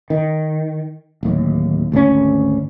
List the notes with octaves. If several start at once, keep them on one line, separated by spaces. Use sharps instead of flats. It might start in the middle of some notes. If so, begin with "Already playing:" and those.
D#3
D1 D#2
G#1 D2 C3 C#4